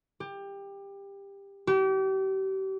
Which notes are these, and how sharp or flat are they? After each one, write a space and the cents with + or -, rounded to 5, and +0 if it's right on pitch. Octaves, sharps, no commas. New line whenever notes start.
G4 +20
G4 -35